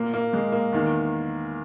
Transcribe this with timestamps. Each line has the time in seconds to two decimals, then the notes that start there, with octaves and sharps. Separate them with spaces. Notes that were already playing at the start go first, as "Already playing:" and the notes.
Already playing: A#2 A#3
0.14 A#3
0.33 G#3
0.52 A#3
0.72 E2 D#3